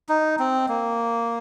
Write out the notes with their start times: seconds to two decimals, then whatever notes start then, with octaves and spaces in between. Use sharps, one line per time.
0.09 D#4
0.39 C4
0.69 A#3